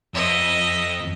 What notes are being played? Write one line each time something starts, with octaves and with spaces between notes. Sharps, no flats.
F2 D#5 E5